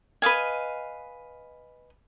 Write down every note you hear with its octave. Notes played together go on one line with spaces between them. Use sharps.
B4 D#5 F5 G#5